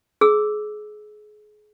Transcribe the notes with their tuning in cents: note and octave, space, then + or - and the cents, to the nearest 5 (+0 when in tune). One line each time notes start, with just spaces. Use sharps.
G#4 +30 E6 +0